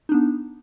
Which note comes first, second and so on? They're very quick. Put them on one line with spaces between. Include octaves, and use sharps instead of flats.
D#4 D4 B3